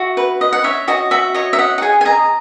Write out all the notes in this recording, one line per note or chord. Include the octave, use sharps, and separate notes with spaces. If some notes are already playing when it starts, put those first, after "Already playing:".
Already playing: F#4 E5
B4
D#5
F#5
C#5 E5
F#4 D#5
F#4 E5
C#5 D#5
E5
D#5 F#5
F#5
G#4 G#5
G#5
D#5 A#5